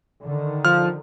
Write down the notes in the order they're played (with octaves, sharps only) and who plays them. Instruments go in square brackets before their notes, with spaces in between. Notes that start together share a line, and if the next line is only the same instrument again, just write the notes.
[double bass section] D3 D#3
[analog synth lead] F3 [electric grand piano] F6